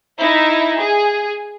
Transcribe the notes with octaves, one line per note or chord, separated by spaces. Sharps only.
D#4 E4 E5
G#4